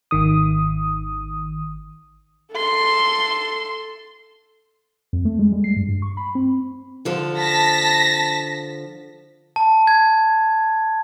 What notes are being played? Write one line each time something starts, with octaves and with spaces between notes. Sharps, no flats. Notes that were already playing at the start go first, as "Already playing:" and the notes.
G#1 D#3 D#6
A4 C6
F2
A3
G#3
G3
C7
G2
G2
C#6
B5
C4
D3 F3 A4
A5 A#6 B6
A5
G#6